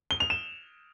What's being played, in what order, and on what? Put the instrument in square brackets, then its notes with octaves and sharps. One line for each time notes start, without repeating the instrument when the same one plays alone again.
[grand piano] G7
F7
E7